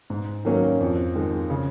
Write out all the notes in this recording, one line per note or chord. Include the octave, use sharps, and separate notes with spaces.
G#2
D#3 F#3 A#3 C#4
F2
D#3 G#3
C#3